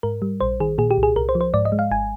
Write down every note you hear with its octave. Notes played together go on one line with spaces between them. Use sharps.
G#2 A#4
G3
A#1 C5
D#3 G#4
A#2 G#4
G4
C2
G#4
C2 A#4
C5
F3
C5
G#2 D5
D#5
G#3
F5
G#1 G#5